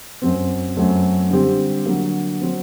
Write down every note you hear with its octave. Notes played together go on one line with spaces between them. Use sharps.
F#2 F#3 C4
F#2 F#3 A3 C4
D3 G3 C4 G4
D3 F#3 A#3
F#3 C4